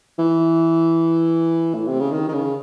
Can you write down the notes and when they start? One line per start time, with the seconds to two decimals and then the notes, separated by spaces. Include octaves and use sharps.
0.19 E3
1.75 A2
1.87 C3
2.00 C#3
2.12 D#3
2.28 D#3
2.33 C#3